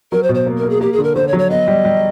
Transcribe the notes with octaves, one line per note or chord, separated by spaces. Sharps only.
F#3 A#4
C5
B2
C5
A#3
A#4
A#3
G#4
A#3 G4
G#4
D3
A#4
D3 C5
C#5
F#3
C#5
B3 D#5
G3
G3